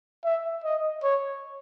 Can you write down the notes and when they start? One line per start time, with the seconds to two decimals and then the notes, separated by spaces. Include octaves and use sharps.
0.24 E5
0.64 D#5
1.03 C#5